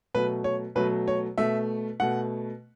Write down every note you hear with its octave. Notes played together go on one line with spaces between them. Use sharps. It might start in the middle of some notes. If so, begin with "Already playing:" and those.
B2 F#3 A3 B4
C#5
B2 F#3 A3 B4
C#5
B2 A3 E5
B2 A3 F#5